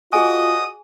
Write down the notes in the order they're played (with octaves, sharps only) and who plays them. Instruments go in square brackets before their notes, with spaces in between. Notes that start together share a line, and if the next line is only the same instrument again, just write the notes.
[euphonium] F4 [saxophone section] F#4 D#5 [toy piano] G#4 G#5 [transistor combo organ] D#6